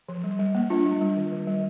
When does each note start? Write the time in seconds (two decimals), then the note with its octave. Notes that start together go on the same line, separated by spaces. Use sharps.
0.09 F3
0.24 G3
0.39 G3
0.55 A#3
0.70 D4 F4
0.86 G3
1.01 G3
1.17 D#3
1.32 D#3
1.47 G3